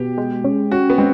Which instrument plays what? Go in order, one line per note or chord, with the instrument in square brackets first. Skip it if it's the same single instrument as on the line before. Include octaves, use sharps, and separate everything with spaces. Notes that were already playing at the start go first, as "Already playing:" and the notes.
Already playing: [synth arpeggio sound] B2 [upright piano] G4
[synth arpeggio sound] G#3
C#4
[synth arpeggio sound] C#4 [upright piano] F#4
[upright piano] B3
[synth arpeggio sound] G#3 [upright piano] C4